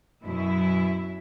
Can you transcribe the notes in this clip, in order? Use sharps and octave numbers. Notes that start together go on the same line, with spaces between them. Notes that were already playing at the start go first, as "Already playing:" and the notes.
F#2 B2 E4